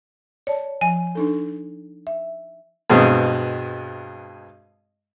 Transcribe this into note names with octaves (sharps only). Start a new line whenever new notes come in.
C#5 D5 A5
F3 G#5
D4 D#4 A4
E5
G2 B2 G#3 C4